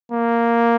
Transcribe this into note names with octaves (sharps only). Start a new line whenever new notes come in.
A#3